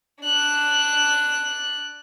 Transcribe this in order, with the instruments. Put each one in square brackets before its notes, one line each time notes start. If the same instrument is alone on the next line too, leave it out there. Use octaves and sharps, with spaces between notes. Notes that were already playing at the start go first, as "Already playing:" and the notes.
[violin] D4 F#6